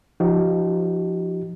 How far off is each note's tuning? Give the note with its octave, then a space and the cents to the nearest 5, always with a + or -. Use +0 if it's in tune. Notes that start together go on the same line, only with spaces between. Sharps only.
F3 -5 D#4 +0 G4 -40